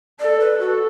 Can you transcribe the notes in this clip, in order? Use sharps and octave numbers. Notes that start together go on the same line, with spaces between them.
A4 D5
B4
F#4 A4